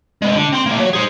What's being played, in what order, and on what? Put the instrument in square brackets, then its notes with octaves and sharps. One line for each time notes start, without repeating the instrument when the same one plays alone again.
[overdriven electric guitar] G#3 B3
D3
C4 C6
A2 A#3
F#3
G#4 C5